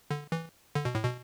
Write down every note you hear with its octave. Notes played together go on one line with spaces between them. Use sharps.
D3
E3
D3
B2
A2
B2